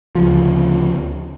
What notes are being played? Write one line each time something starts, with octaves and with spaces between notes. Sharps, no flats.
D2 C#3 F3